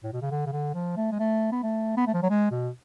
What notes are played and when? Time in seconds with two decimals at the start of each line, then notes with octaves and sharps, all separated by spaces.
0.03 A2
0.13 B2
0.22 C#3
0.31 D3
0.46 C#3
0.52 D3
0.74 F3
0.97 A3
1.12 G#3
1.19 A3
1.52 B3
1.63 A3
1.97 B3
2.07 A3
2.14 F3
2.23 F#3
2.30 G#3
2.51 B2